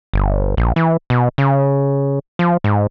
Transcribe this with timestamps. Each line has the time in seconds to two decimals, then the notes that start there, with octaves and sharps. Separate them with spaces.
0.14 G1
0.57 A#1
0.76 E3
1.10 B2
1.38 C#3
2.39 F3
2.64 G#2